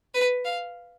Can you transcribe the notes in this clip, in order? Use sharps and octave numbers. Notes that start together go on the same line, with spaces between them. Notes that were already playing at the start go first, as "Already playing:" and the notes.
B4
F5